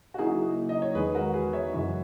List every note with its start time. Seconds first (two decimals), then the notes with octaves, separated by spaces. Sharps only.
0.14 F#4
0.18 C#3 F#3 A#3 D#4 E4 G#4
0.69 D#5
0.82 C#5
0.95 E2 D#3 G#3 G#4 B4
1.14 F#4 A#4
1.33 G#4 B4
1.53 C#5 E5
1.73 F#2 C#3 E3 G#3